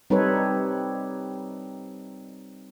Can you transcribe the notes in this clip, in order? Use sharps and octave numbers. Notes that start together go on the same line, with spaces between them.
G3 C4 D#4 A4 B4 C#5